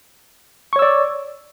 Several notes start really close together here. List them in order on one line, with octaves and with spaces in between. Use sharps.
C#6 C#5 E6 D5